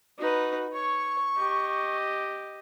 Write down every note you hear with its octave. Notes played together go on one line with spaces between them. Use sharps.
D#4 F#4 B4
C#5 C#6
G4 D#5